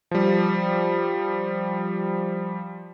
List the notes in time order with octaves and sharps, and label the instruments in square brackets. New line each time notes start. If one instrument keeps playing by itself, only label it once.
[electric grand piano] F3 G3